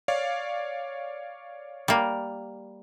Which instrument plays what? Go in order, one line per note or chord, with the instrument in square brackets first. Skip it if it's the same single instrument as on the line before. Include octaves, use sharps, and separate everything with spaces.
[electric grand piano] C#5 D5 F5
[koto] G3 A#3